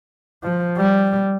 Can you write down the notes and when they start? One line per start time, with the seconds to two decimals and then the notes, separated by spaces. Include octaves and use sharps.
0.43 F3
0.77 G3